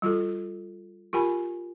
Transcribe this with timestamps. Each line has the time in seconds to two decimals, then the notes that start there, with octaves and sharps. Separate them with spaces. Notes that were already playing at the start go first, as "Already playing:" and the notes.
0.02 G3 F4 F#4 A4
1.13 F4 G4 A#4 G#5 B5